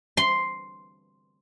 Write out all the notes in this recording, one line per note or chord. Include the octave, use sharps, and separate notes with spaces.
C6